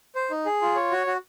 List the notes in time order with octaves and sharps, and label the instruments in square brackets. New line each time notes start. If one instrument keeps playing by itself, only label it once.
[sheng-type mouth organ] C5
D#4
G#4
F4
C#5
F#4
F#4